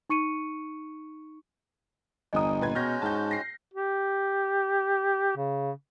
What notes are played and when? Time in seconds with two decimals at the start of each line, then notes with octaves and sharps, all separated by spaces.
0.10 D#4 C#6 C#7 D#7
2.33 G1 E2 D#5 A#5 D#6
2.61 A#2 B4 G#6
2.75 B2 G#3 C#4 F#4 F6 G6 A#6
3.02 G#2 A5 G6
3.31 A#6 C7
3.74 G4
5.37 C#3